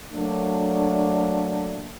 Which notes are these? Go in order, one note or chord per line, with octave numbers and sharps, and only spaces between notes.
F#3 A3 A#3 D4